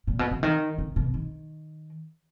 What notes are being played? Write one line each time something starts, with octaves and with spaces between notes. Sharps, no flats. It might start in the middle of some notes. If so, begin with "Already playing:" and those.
A#2
B2
C#3
D#3
C#3
B2
D#3